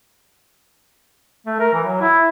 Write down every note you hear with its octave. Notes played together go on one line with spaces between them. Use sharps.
A3
A#4
E3
F#3
E4